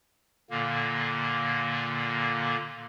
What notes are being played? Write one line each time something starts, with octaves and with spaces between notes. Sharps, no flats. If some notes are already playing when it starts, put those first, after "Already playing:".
A#2 D3 A#3